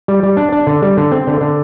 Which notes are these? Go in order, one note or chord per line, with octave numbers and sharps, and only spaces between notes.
G3
G3
D4
D4
D3
G3
D3
C4
D3
D3